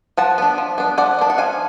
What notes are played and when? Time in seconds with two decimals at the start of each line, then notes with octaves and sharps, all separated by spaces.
0.17 F3 F#5 A5
0.38 B3 D4
0.58 F3
0.78 B3 D4
0.98 F3 D5 F#5
1.19 B3 D4 F5
1.30 F#5
1.38 F3 F5 G#5